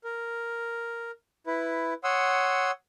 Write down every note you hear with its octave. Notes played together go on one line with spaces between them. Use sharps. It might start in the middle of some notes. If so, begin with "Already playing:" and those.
A#4
E4 B4
C#5 F#5 C6 D#6 E6